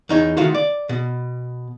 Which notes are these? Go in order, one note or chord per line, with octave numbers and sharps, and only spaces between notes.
E2 D#4 C#5
D#3 A3 F4 F#4
D5
B2